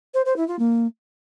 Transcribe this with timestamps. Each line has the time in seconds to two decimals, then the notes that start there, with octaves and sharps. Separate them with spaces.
0.14 C5
0.25 C5
0.36 E4
0.48 F4
0.59 A#3